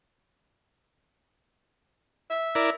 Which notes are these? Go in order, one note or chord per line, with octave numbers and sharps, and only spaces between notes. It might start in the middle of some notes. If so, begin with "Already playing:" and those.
E5
E4 A#4 D5